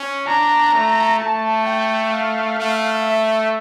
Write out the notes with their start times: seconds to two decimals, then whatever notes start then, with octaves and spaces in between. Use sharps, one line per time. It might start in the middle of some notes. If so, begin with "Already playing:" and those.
Already playing: C#4
0.27 D4 A#5
0.74 A3
1.20 A3 A5
1.66 G5
2.12 F5
2.59 A3
3.05 E5